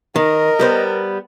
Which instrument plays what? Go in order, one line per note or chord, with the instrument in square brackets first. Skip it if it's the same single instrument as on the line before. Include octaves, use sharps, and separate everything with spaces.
[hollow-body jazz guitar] D#3 [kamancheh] A#4 [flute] D#5
[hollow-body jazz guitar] G3 B3 C5